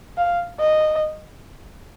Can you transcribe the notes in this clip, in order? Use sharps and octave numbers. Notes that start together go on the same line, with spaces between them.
F5
D#5